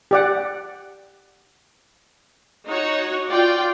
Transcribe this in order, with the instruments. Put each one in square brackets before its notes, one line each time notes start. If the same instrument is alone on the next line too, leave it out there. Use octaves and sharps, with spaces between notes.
[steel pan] G4 D5 F#5
[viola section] D#4 F#4 C#5 F#5
F4 D5 G5